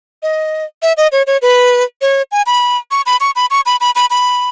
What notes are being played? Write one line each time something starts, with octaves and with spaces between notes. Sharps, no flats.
D#5
E5
D#5
C#5
C#5
B4
C#5
G#5
B5
C#6
B5
C#6
B5
C#6
B5
B5
B5
B5